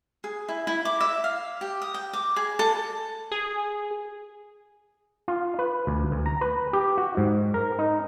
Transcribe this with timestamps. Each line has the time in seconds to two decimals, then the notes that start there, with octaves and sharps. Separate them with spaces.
0.24 G#4
0.49 E4
0.67 E4
0.85 D6
1.00 E5
1.24 F5
1.61 G4
1.82 D#6
1.94 G5
2.13 D6
2.36 G#4
2.59 A4
3.32 G#4
5.28 F4
5.59 B4
5.87 D2
6.12 D2
6.26 A#5
6.41 B4
6.73 G4
6.98 F#4
7.17 G#2
7.54 A#4
7.79 D#4